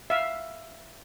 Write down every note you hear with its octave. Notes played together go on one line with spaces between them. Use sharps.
E5 F5